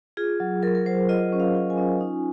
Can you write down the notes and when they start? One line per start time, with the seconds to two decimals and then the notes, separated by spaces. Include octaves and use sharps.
0.17 F4 G#4
0.40 F#3
0.63 F#3 A#4
0.75 A#4
0.86 F#3 C5
1.09 F4 D#5
1.32 C#4
1.40 F5
1.55 F4
1.70 G#5
1.78 C#4
2.01 D#4